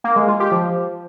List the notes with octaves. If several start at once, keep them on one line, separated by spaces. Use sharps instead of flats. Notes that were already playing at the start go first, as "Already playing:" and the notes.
A#3
G#3
F4
G4
F3